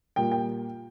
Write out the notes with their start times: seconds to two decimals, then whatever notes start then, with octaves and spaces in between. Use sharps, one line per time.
0.16 A#2 G3 A#3 G5
0.32 G5